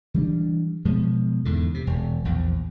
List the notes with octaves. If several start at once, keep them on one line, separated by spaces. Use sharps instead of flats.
E3 G3 D4
B2 F3 G#3
E2 G#2 D3
C3
E1
A#1 E2